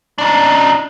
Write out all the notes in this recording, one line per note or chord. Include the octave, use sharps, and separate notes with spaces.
D4 D#4